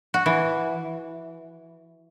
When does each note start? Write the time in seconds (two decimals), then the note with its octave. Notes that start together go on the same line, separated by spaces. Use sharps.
0.14 F#4
0.26 E3